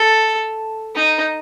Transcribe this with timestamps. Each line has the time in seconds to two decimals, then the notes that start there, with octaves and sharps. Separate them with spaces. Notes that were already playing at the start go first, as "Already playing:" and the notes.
Already playing: A4
0.95 D#4